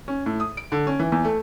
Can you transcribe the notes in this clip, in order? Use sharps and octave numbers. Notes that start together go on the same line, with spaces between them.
C#4
A2
D#6
D7
D3
C#4
E3
E2
A3